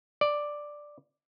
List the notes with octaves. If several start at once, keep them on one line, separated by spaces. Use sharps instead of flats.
D5